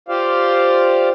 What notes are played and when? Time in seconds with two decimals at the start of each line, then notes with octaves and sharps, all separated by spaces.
0.09 F4 G4 C5 D5 F5